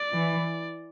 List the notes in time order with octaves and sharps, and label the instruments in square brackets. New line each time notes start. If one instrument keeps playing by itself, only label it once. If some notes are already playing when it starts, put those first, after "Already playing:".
Already playing: [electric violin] D5
[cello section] E3